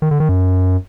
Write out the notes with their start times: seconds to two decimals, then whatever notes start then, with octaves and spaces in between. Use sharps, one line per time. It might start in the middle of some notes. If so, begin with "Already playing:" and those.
0.02 D#3
0.11 D3
0.20 D#3
0.29 F#2